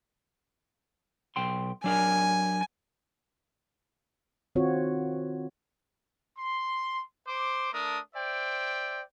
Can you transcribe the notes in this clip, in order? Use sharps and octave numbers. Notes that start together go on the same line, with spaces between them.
B1 G5 C6
F#3 D4 A#4 G#5
D#3 C4 F4 F#4 C#5
C6
C5 D6
A3 D4 A#4 D#6
C5 D5 E5 G5